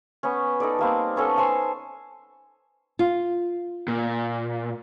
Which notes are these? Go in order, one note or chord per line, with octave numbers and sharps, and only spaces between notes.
B3 C#4
D#4 A4 D5
G3 A#3 C4
B3 C#4 A4 A5
C5 C#5 G#5 A5
F4
A#2